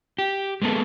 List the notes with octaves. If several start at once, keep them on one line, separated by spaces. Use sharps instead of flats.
G4
G#3 A#3 B3 A4